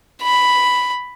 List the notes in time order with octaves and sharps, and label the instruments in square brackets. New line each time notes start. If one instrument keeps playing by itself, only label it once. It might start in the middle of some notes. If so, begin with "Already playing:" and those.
[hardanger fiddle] B5